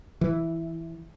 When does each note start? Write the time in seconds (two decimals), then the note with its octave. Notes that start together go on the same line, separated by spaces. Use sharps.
0.21 E3